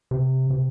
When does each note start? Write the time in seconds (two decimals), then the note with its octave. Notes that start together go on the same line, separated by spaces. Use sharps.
0.11 C3
0.50 C3